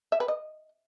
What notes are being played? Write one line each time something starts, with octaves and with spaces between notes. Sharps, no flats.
E5
B4
D#5